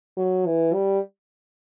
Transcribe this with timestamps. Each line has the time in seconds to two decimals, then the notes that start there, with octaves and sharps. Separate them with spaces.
0.17 F#3
0.46 E3
0.74 G3